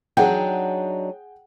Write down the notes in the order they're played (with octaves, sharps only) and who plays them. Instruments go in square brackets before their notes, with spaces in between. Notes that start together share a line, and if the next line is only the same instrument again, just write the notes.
[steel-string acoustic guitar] F#3 D4 D#4 [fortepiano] G#4 F#5 G5